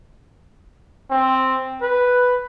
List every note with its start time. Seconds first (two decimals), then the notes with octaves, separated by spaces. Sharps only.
1.10 C4
1.81 B4